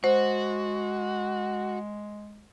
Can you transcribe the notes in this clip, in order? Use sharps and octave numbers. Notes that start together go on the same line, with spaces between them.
G#3 F#4 C5